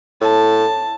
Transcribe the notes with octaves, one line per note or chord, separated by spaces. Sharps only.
A2 A5